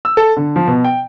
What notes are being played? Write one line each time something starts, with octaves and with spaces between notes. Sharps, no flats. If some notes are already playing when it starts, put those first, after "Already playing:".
E6
A4
D3
F3
B2
G5